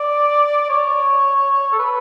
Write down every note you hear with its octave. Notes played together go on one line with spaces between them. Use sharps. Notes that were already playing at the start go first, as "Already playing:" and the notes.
Already playing: D5
C#5
A4
B4